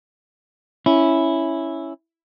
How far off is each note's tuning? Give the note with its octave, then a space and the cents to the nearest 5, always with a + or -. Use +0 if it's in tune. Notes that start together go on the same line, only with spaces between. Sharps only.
C#4 +0 E4 +0